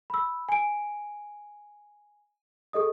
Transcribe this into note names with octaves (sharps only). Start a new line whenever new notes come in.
B5 E6
G#5 D7
G#4 A4 D#5 D#6